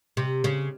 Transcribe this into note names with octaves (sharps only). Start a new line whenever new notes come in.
C3
C#3